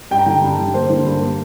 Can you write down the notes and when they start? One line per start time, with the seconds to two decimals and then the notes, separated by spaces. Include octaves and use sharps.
0.11 G2 G5
0.19 A#5
0.26 D3 G5
0.42 G2
0.58 D3
0.74 A#3 C5
0.90 D3
1.05 G2
1.21 A#3